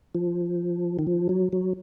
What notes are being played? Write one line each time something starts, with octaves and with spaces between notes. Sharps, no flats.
F3
D#3
F3
F#3
F#3